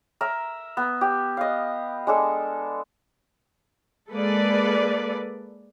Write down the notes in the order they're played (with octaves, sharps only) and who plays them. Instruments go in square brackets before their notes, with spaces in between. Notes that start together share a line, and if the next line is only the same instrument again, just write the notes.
[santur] A#4 E5
B3
G4
D#5 F5
G#3 D4 A4
[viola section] G#3 A#3 A4 B4 D5